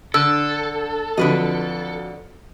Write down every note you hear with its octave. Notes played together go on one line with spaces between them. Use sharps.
D3 A4 E6
F2 D3 F#3 B4 D#5